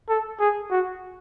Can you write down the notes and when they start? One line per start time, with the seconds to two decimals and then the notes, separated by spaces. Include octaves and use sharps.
0.09 A4
0.40 G#4
0.71 F#4